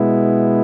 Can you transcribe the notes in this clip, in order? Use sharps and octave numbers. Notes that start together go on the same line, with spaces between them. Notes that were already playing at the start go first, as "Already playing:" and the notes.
Already playing: B2 G#3 B3 E4